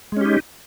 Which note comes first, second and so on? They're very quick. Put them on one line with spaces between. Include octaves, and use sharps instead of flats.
G#3 C#4 G4 D#4